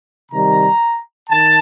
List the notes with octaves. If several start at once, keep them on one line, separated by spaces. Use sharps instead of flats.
C3 D#3 G3 A#5
D#3 A5